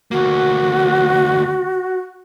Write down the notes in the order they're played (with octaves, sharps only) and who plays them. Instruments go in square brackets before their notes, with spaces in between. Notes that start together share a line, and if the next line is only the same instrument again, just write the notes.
[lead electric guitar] D2 A#3 [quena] F#4